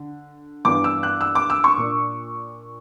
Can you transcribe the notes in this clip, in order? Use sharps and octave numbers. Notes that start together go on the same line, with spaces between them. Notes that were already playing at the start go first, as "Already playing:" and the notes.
Already playing: D3
G2 E3 B3 D4 D6
E6
F#6
E6
D6
E6
C#6
A#2 A#3 D4